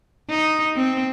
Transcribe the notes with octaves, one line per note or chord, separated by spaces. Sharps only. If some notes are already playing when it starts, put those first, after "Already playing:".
D#4
C4